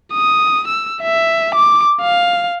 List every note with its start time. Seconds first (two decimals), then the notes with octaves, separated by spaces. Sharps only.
0.13 D#6
0.68 E6
1.02 E5
1.55 D6
2.01 F5